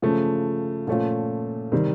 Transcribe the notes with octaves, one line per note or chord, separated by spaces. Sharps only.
C#3 F3 A3
A#2 F3 A3 C#4 F4
C3 D#3 G3 C4